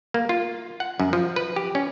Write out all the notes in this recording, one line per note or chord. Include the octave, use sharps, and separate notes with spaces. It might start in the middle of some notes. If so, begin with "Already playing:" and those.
A#3
F4
F#5
F#2
F3
B4
G4
C#4